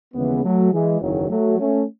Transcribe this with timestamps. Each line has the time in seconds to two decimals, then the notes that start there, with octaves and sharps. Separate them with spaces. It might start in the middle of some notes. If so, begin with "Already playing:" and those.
0.14 D#2 C#3 E3 G#3 B3
0.44 F#3 A3
0.73 E3 G#3
1.01 F#1 E2 D#3 F#3
1.30 F#3 A3
1.59 A3 C#4